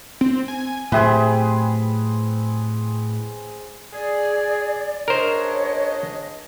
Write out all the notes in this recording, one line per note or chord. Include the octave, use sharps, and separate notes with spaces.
C4
G#5
A2 F#3 C4 G4 G#4 B4 E5 G#5
G#4 D5
C#2 D4 A#4 C5 C#5 D#5